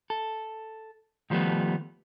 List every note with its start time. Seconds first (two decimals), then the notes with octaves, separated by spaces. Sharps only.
0.10 A4
1.30 D#3 F3 G3 A3 B3